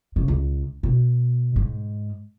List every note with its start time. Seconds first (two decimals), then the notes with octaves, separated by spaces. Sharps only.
0.16 C#3
0.28 C#2
0.83 B2
1.56 G#2